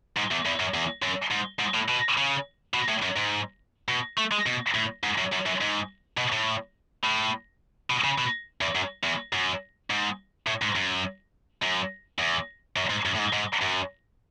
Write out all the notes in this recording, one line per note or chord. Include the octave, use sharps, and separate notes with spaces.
G#2
E2
E2
F#2
E2
F#2
G#2
G#2
A2
B2
C#3
B2
A2
F#2
G#2
B2
A3
G#3
B2
A2
G#2
F#2
F#2
F#2
G#2
B2
A2
A2
B2
C#3
B2
E2
F#2
E2
F#2
G#2
A2
G#2
F#2
F#2
E2
F#2
G#2
F#2
A2
G#2
G#2
F#2